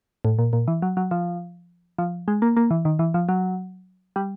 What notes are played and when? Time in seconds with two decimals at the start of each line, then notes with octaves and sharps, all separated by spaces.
0.25 A2
0.39 A#2
0.53 A#2
0.68 E3
0.82 F#3
0.97 F#3
1.11 F3
1.98 F3
2.28 G#3
2.42 A#3
2.57 A#3
2.71 E3
2.85 D#3
2.99 E3
3.14 F3
3.29 F#3
4.16 G3